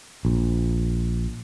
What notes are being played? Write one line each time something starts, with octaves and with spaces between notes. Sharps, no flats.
A#1